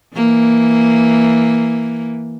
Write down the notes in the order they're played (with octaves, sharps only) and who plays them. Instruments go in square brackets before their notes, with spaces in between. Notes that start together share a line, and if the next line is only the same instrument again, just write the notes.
[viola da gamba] E3 A#3